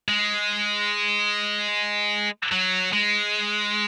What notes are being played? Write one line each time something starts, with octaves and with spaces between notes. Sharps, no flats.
G#3
F#3
G#3